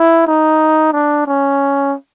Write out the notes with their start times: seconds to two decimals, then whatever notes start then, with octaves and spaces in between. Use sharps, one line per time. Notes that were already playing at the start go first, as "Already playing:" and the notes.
Already playing: E4
0.27 D#4
0.93 D4
1.27 C#4